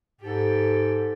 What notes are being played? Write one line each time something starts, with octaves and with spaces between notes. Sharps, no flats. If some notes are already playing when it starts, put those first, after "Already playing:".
G#2 G4 A4